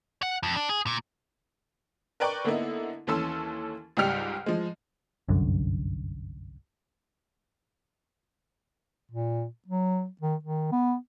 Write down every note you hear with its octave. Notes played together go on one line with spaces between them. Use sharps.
F#5
F2
D4
G#4
A#2
A#4 B4 D5 G5 C#6
D3 A#3 B3 D#4 E4
D#2 E3 C#4 A4 C6 E6
C#2 G#2 G3 G4 F6 C#7
F3 G#3
G1 C2 F#2 D3
A#2
F#3
D#3
D#3
B3